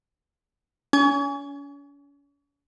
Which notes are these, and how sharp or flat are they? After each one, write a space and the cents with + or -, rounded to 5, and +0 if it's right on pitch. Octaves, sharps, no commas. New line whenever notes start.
C#4 +40 G#5 +0